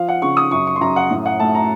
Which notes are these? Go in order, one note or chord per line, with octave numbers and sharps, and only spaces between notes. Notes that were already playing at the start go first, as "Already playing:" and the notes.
Already playing: F3 F5
F#5
C#3 C#6
D#6
F#2 C#6
C#6
C6
F#2 A#5
F#5
A2
F#5
A3 A5
A#5